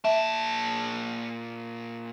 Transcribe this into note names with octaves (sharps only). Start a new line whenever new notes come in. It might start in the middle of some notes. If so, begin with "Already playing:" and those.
A#2 E5 A5